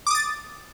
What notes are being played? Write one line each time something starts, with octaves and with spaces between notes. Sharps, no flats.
D6 D#6 A6